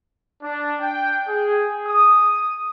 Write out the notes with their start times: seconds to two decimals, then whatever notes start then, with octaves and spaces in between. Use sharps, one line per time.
0.43 D4
0.81 G5
1.28 G#4
1.87 D#6